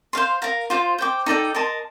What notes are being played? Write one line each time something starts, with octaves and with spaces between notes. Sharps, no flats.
C5 F5 C6
A#4 F5 A#5
F4 C5 F5
C5 G5 D6
D#4 A4 D5 G5
A#4 D#5 A5 C6